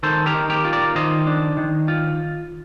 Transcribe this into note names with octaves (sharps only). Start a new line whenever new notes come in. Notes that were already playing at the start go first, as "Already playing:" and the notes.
D#3 A4 C5
G4 A#4
D#3
G4 A#4
F4
A#4 D5
D#3 C5 D#5
D4
D#3
F4